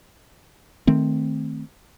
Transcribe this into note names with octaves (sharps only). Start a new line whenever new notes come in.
D#3 A3 C4